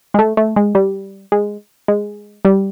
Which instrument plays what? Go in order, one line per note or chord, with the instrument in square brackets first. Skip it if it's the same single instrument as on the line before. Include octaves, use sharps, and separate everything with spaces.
[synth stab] G#3
A3
A3
G#3
G3
G#3
G#3
G3